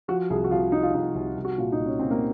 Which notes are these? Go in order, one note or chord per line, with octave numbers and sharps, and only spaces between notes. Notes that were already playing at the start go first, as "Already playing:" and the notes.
F3 F#4
C2 G#4
F#4
C2 F4
F3 D#4
F4
C2 D#4
C2
C2
F#4
A#2 F4
D#4
C2
C#4
A#2 C4
A#3